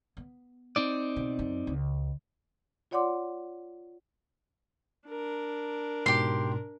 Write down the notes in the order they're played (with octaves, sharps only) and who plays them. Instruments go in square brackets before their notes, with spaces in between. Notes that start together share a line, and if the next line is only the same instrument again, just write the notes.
[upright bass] B3
[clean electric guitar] C4 D#4 D5
[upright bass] B2
F#2
C#2
[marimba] F4 C#5 D5 F#5 C6 D6
[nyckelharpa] D4 A#4
[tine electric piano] G#2 B2 [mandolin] G4 C6